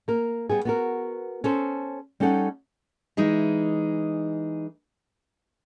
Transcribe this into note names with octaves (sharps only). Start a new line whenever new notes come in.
A#3 A#4
G3 B3 G#4
B3 F#4 A#4
C#4 A4 C5
G3 C#4 D#4 A4 F#5
E3 G#3 D#4